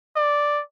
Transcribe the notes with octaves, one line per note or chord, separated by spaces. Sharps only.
D5